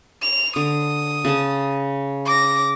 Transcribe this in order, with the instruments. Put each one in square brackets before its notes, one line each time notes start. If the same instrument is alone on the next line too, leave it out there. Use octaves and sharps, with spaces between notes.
[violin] F7
[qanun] D3 [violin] D#6
[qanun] C#3 A5
[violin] D6 A#6